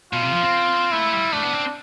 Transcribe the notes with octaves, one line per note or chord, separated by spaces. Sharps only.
B2 F4
C3
F3
C4
A3 E4
G3
A3 D4
B3
C4